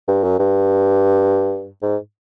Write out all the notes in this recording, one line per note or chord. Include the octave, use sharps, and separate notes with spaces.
G2
F#2
G2
G#2